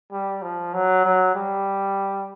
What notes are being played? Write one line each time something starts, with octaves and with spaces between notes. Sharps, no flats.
G3
F3
F#3
F#3
G3